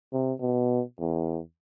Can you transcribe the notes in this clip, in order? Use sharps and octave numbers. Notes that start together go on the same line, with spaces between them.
C3
B2
E2